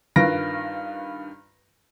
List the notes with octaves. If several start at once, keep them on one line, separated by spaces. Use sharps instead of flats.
G2 D#3 F4 B4 A#6 D7